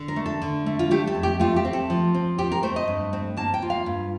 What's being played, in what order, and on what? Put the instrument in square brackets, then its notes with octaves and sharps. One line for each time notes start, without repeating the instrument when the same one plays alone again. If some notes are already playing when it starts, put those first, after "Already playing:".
Already playing: [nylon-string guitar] D3
A#4
A3
A4
D3
A3
F4
A3 G4
A4
F2
G4
A3 F4
G4
C4
A4
F3
C4
C4 G4
A#4
A3 C5
D#5
G2
C4
A#3 A5
G5
F4
F5
G2